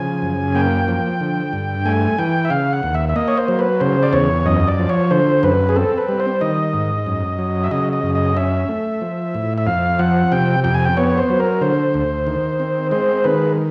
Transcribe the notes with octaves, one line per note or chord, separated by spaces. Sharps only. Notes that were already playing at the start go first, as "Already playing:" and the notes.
Already playing: C#3 F3 G#5
F#2
A#3 G5
F3
D3
G2
A3 G#5
E3 G5
E5
C#3 F5
F#5
D#2
E5
E5
A#3 D#5
C#5
C5
F#3
B4
C#3 C5
D5
E2 C#5
F#2 D#5
D5
F3
C#5
D3 C5
F#2 B4
G#4
C4 A4
B4
G3
C5
D#3 D#5
G#2
F#2
F#3
E5
C#3 D#5
D#5
F#2
D#5
C#4 E5
A3
F3
A2
E5
F2 F5
F3 F#5
C3 G5
F2 G5
G#5
G5
B3 C#5
C5
F#3
A#4
D3 C5
D2
D#3
C4
G#3 C5
D#3 B4